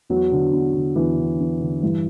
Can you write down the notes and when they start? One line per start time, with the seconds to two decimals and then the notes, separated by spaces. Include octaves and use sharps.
0.09 E2 F#3
0.32 D3
0.53 E2
0.75 D3
0.96 E2 E3
1.18 D3
1.40 E2
1.60 D3
1.83 G2 E3